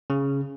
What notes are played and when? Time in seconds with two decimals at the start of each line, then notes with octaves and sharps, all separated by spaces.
0.10 C#3